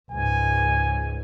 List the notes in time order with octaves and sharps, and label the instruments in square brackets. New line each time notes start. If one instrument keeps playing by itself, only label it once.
[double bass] C#2 G#2 [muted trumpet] G#5